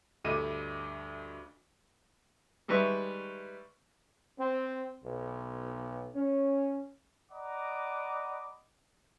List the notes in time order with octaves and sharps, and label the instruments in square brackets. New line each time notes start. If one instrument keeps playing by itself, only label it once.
[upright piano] D2 G2 A3 D#5 D6 D#7
[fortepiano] D#3 G3 G#3 B4 E5 C#6
[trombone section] C4
B1
C#4
[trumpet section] D5 D#5 F#5 A#5 B5 D6